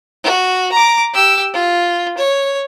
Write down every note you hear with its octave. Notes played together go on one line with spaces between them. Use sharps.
F#4
A#5 D6
G4 E6
F4
C#5